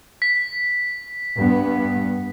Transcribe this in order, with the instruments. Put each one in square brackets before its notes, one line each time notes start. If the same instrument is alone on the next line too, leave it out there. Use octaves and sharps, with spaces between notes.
[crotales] B6
[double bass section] G2 B3